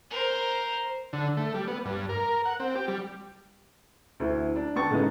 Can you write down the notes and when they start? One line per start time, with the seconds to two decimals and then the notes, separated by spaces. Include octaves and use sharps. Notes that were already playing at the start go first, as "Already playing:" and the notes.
0.10 A#4 C5
1.13 D3
1.37 A3
1.54 G3
1.68 B3
1.85 G2
2.09 A#4
2.45 F#5
2.60 C4
2.75 G4
2.88 G3
4.20 D2 E4
4.56 D4
4.75 D3 B3 G5 A5 C#6 A6
4.90 A2 C#3 G#3 B3 D#4